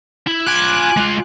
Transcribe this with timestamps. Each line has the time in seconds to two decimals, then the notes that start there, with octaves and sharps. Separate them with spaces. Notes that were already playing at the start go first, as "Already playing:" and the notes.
0.27 E4
0.46 F4 G#5 B5 D6 F#6
0.97 G#3 F4